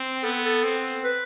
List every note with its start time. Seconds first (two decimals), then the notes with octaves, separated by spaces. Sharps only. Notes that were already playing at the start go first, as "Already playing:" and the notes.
Already playing: C4
0.23 B3 A4
0.43 A4
0.64 C4
1.04 B4